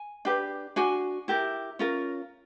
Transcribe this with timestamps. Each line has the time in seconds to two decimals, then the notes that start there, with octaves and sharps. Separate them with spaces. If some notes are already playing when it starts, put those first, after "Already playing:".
Already playing: G#5
0.25 D4 G4 B4
0.76 D4 F#4 G#5
1.28 E4 G4 A#4
1.79 C#4 F4 A#4